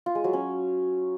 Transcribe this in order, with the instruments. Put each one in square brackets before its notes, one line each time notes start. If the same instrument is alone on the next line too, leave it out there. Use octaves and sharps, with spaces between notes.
[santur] F4
G#3
F#3
C#4